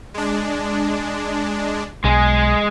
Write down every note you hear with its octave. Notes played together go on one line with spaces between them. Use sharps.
G#3 D4
B1 G#3 G#4